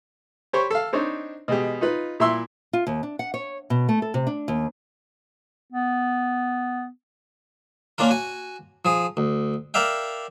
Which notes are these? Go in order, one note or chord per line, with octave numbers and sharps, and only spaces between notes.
G4 C5 C#5 B5 C#6
A4 F5
C4 D4 D#4 C5 C#5
B2 G#3 G4
D#4 F4 B4
A#2 E4 E5 C6 E6
F4
D#2
D4
F#5
C#5
B2
A3
A4
C3
D4
D#2
B3
A#3 C#4 D4 F4 A#4
F#4 G#5
F3 G#4
D2
A#4 D5 E5 F5 G5